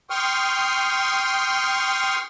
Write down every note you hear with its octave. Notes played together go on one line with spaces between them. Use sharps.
G5 C6 C#6 D#6 F6